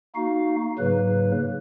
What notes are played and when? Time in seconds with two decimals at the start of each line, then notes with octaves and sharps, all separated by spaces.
0.15 A#3 D#4 F#4 F5
0.79 G#2 C#3 F#3 A#3 B4